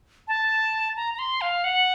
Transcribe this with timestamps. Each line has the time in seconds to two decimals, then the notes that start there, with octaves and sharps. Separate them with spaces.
0.28 A5
0.96 A#5
1.14 A#5
1.19 C6
1.41 F5
1.64 F#5